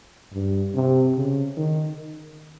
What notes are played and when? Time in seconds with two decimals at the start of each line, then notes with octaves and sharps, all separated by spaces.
0.33 G2
0.75 C3
1.16 C#3
1.57 D#3